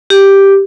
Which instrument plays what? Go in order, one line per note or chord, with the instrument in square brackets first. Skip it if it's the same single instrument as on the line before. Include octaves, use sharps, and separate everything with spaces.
[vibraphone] G4